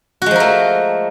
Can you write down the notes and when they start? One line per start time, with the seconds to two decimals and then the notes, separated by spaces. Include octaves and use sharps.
0.22 F#4
0.26 G#3
0.31 F3
0.36 A#4
0.40 A3